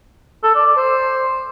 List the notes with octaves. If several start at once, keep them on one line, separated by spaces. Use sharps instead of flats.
A4
D5
D5
C5